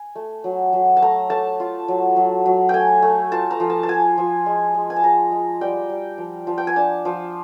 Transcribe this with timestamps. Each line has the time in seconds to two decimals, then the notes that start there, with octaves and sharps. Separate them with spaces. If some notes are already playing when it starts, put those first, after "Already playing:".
Already playing: G#5
0.15 A3
0.44 F#3
0.73 F#3
0.97 A5
1.02 A3 A#5
1.30 A3 A5
1.60 F4
1.88 F#3
2.16 F#3
2.46 F#3
2.69 A3 G5 G#5
3.02 A3
3.32 F4 A5
3.51 A#5
3.60 F3
3.70 A5
3.83 A5
3.88 F3 G#5
4.18 F3
4.46 G#3
4.75 G#3
4.90 G#5
4.96 A5
5.03 G#3 A#5
5.32 G#3
5.61 G3 G5
5.89 G3
6.18 F3
6.47 F3
6.58 G5
6.67 G#5
6.76 D4 A5
7.05 F3